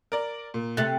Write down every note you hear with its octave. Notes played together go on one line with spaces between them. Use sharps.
A#4 D5
A#2
C3 A3 F#6 A6